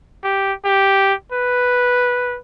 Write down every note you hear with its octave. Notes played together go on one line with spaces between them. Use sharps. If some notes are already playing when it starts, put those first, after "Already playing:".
G4
G4
B4